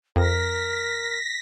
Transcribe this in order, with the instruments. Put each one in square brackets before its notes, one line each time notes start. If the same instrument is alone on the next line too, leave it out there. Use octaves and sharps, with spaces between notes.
[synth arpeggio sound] F2 [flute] A#4 [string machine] A#6 B6